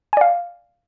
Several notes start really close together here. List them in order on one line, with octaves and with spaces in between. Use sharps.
G#5 D5 F5